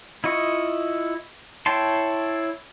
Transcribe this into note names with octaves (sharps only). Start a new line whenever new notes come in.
E4 F4 D#5 C#6
E4 C#5 G5 A5 C6